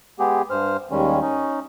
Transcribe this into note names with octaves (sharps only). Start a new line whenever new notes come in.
G#3 B3 G4 G#4
G2 C5 F6
D#2 D#3 G3 G#3 C#4
C#4 D#4